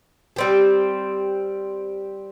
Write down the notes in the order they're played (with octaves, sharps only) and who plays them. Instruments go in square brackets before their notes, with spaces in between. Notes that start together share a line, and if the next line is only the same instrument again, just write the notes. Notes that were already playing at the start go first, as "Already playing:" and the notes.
[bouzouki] G3 C4 G4